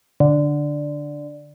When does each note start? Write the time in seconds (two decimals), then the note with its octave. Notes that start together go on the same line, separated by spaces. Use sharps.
0.20 D3